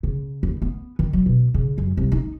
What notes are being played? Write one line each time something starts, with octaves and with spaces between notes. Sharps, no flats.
C#3
D#2
B3
D#3
F#3
B2
C#3
F#2
C2
D#4